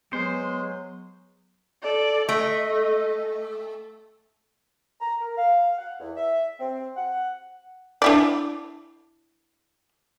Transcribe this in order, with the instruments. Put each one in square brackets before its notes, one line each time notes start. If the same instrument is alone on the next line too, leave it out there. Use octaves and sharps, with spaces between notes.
[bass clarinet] F#3 [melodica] G#3 [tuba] B3 [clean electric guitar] C5
[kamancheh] A4 D5
[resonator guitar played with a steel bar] A3 [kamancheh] D#5
[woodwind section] A#5
A#4
F5
F#5
E2
E5
C4
F#5
[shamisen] D4 E4 D5